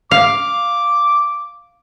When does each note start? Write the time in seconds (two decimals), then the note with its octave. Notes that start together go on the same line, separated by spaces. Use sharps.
0.11 F5 D6